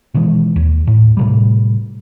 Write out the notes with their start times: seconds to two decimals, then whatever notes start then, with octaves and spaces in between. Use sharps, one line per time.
0.14 B2 D#3 E3 G#3
0.56 D#2
0.87 A2
1.17 A2 C3 G3